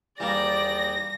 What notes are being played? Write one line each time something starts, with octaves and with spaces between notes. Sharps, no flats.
D#2 E3 G3 A#3 G#4 D5 G5 A#6